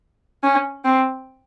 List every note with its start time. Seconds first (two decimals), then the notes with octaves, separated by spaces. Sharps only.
0.43 C#4
0.85 C4